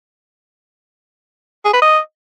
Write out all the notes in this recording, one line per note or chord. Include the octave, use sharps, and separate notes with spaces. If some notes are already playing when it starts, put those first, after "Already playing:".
G#4
B4
D#5